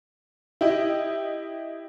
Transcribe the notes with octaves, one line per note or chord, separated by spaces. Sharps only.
E4 G4 D#5